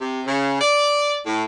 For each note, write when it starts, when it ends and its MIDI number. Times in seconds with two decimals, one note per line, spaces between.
0.01 0.23 48
0.26 0.61 49
0.61 1.20 74
1.26 1.44 45